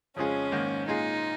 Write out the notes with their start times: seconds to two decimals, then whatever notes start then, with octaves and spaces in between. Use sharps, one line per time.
0.16 F2 C#3 G#3 C#4 F4 G#4
0.52 G#2 D#3 A#3
0.88 A#2 G#3 D#4 F4 G#4